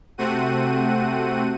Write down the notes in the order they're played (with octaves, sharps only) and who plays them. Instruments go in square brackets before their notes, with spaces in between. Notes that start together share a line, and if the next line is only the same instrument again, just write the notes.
[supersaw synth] C3 A3 C4 F#4 F#5 D#7